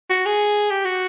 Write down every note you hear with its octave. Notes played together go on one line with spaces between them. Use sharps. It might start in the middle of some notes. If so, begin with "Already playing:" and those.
F#4
G#4
G4
F#4